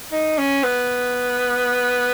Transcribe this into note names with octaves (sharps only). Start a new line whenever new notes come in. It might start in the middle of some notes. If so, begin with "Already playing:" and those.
D#4
C#4
B3